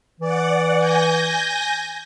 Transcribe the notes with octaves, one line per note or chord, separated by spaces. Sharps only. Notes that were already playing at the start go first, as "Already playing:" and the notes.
E3 D5 F#5
G#5 G6 A#6